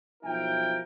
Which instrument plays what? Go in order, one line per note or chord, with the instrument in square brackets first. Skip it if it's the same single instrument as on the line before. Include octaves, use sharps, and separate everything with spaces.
[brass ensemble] B1 F3 D#4 E4 A#4 G5